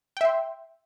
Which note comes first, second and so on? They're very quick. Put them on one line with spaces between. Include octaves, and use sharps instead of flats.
G5 E5 C6